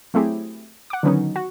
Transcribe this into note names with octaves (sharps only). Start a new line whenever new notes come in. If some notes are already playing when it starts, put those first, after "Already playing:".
F#3 A3 C4 E4 G4 G#4
F#5 D6
D3 D#3 F#3 B3 C#4 D#4
F#4